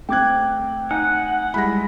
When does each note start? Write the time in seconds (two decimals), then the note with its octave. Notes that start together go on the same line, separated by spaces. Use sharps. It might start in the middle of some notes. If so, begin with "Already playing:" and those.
0.09 A3 C4 G5 D6 F#6 G#6
0.91 D#4 F#5 G#5
1.54 G3 G#3 E4 B5 A#6